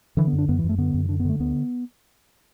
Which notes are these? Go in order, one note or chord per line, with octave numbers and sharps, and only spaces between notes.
D3 E3
B3
F#2
D4
F#2 B3
E3
F#2
A3
D3 B3
F#2
D3 D4
B3
D3 A3
D2 B3